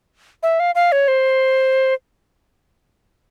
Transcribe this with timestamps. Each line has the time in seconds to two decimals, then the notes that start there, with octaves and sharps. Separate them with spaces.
0.43 E5
0.60 F5
0.75 F5
0.92 C#5
1.08 C5